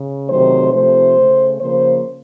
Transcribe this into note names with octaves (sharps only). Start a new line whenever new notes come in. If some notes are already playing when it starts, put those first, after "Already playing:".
Already playing: C#3
C3 D#3 F#3 A3 C5
C3 F3 A3 C5
C#3 A3
C#3 F3 A#3 C5